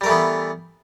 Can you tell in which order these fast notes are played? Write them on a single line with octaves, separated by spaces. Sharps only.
G3 A#4 A3 E3 B3